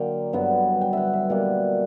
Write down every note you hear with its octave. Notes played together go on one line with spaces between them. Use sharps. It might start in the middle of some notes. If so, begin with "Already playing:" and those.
Already playing: D3 F#3 A#3 G5 A#5
G2 D3 F#3 B3
G5
E5 F#5
E5
B2 G3 A#3 F#5